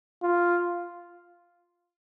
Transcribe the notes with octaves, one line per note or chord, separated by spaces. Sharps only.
F4